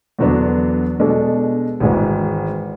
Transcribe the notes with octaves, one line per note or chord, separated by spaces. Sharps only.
E2 D3 F#3 B3 D4
B2 G#3 D4 A4
G#1 G#2 E3 G#3